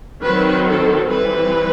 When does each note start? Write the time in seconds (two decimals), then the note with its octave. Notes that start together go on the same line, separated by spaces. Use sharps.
0.23 D#3 F#3 C4 B4
0.67 A4
1.09 E3 G3 C4 B4